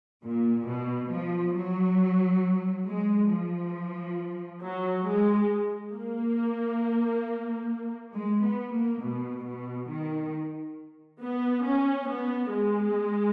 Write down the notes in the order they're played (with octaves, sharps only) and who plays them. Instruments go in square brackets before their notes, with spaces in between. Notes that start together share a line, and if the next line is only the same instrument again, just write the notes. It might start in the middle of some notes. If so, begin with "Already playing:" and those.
[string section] A#2
B2
F3
F#3
G#3
F3
F#3
G#3
A#3
G#3
B3
A#3
B2
B2
D#3
B3
C#4
B3
G#3